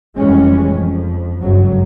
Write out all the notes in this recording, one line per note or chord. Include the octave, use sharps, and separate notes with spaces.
F1 E3 G3 G#3 C#4
F2
G1 C#2 F#2 F#3